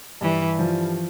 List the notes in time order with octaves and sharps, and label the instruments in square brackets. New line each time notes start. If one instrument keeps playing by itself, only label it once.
[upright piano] G2 [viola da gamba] E3
[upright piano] F3